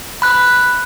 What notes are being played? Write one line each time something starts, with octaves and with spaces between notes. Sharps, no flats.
B5 F#6